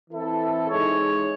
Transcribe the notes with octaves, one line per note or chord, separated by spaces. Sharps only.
E3 C4 E4 A4
E3 G#3 D#4 G#4 C#5